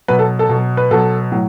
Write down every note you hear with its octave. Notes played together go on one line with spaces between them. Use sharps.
B2 F#3 B4
A4
A4
B2 F#3
B4
B2 F#3 A4
A2 F#3